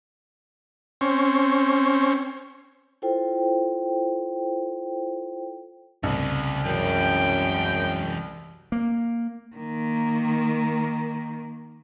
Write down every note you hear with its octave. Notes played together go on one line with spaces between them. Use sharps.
C4 C#4
E4 F4 A4 C5 G5
C2 C#3 A3
F#2 E3 G#3 G5
A#3
D#3 A#3